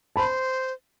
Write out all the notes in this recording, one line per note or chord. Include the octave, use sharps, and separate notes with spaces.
C5 A5 B5